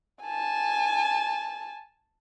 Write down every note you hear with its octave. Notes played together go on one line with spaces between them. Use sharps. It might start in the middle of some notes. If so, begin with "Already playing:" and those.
G#5 A5